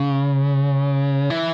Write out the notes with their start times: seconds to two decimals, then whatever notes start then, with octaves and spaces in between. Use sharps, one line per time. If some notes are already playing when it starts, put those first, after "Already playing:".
Already playing: C#3
1.30 E3